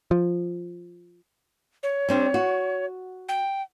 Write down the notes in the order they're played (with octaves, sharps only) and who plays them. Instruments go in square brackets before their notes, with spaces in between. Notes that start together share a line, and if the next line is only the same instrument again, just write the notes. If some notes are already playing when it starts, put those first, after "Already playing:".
[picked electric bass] F3
[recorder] C#5
[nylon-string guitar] G3 C4 D4
F#4
[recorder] G5